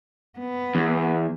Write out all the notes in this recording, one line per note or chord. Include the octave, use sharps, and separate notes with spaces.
B3
E2